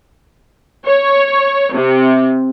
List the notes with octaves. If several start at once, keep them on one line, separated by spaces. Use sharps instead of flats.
C#5
C3